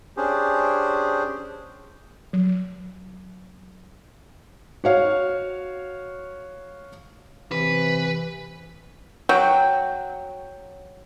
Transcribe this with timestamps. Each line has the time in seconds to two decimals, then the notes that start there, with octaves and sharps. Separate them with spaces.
0.17 C#4 D4 G4 G#4 C5
2.33 F#3
4.84 F#4 C#5 F5
7.52 C3 E3 B4
9.29 F#3 G5